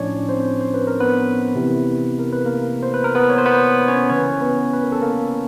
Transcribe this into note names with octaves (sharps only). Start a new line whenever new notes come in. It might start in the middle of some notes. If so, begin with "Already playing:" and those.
Already playing: A2 F3 C#4 D4 C#5 D5
C4 C5
C5
B4
A#4
B3 B4
C3 E3
A#4
B4
A#3 A#4
C5
B4
A#4
B3 B4
C#5
C5
B3 B4
C#4 C#5
C#3 E3 C#4 C#5
B3 B4
B4
A#4
A4
A#3 A#4